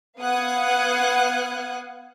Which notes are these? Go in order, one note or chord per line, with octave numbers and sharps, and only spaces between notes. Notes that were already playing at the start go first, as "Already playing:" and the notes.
B3 F5 F#5 D#6 F#6 G#6